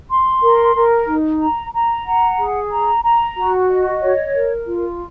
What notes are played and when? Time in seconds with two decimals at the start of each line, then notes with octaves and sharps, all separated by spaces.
0.09 C6
0.42 A#4
0.75 A#4
1.07 D#4
1.40 A#5
1.73 A#5
2.06 F#5
2.38 G#4
2.71 A#5
3.03 A#5
3.36 F#4
3.69 D#5
4.01 C#5
4.34 A#4
4.67 F4